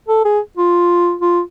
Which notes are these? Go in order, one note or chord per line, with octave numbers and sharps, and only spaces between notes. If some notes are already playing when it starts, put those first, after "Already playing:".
A4
G#4
F4
F4